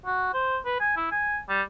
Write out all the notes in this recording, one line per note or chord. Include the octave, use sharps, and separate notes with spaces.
F#4
C5
B4
G#5
E4
G#5
G3